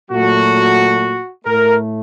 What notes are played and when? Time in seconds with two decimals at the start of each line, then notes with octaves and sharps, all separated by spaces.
0.10 A#2 F#3 A3 F#4
1.45 A2 A3 A#4